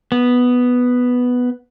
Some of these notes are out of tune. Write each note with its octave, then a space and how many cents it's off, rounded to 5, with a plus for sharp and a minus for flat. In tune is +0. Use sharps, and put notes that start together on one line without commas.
B3 +0